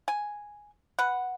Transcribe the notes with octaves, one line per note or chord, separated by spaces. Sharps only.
G#5
B4 F#5